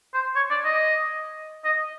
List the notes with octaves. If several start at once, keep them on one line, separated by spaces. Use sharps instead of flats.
C5
C#5
D5
D#5
D#5